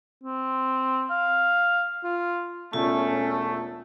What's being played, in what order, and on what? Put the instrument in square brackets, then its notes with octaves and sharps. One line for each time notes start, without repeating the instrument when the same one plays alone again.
[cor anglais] C4
F5
F4
[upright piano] E1 [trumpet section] A3 [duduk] C#4 [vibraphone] F4